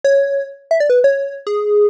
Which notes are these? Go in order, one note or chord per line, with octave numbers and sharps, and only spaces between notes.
C#5
E5
D5
B4
C#5
G#4